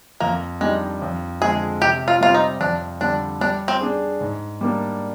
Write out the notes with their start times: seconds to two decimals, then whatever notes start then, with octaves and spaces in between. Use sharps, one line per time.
0.20 F2 A#3
0.61 D#3 G3 G#3 D4 G4
1.02 F2
1.41 D3 F3 G#3 G#4
1.81 C3 G4
2.08 F4
2.21 G3 C4 F4 G4
2.34 D#4
2.60 F2 D4
3.01 D3 G3 D4
3.41 G3 D4
3.68 C4
3.81 D4 G#4
4.21 G#2
4.61 G3 A#3 D4